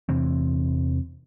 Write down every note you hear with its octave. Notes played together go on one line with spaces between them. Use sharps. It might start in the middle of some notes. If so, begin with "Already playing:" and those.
E2 C3 E3 C4